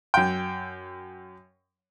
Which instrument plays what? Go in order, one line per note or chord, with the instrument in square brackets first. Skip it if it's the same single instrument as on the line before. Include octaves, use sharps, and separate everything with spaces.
[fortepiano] F#2 G5